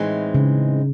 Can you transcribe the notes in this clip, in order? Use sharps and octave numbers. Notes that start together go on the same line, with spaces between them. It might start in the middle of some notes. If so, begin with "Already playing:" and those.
Already playing: A2 E3 G#3 C4 D#4
C#3